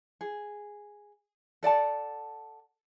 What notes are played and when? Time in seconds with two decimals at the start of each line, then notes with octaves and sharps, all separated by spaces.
0.21 G#4
1.63 A4 D5 F#5 A5